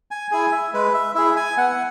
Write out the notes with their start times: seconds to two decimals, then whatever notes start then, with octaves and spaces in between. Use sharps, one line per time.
0.11 G#5
0.31 E4 G#4 G#5
0.52 E5
0.73 G#3 B4
0.94 E5
1.15 E4 G#4 E5
1.36 G#5
1.57 B3 F#5